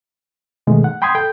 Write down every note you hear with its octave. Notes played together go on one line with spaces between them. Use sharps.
B2 D#3 G#3 A3
F#5
G5 B5 C6 D#6 G#6
A4 G5